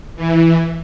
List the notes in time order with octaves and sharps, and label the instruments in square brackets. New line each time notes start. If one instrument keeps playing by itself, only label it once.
[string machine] E3